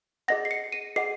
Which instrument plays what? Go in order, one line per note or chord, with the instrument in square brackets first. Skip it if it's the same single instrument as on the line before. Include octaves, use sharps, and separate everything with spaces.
[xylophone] G#4 D#5 F#5 A#6
C7
C#7
D#7
G#4 D#5 F#5 C7